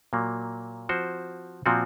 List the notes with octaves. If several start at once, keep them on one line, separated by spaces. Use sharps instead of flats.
A#2 F#3 A#3
F3 C4 F#4 C5
A#2 F3 C4 F#4